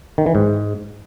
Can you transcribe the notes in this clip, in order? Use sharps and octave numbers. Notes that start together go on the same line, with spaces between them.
D#3
E3
G#2